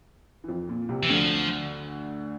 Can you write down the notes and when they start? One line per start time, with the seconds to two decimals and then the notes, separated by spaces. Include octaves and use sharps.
0.44 E3
0.48 F2 F3
0.69 A#2
0.89 C2 C3
1.03 E3
1.09 D2 D3 F3